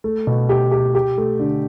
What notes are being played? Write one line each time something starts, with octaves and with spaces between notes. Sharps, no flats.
A3
B2
G4
G4
G4
A3
D3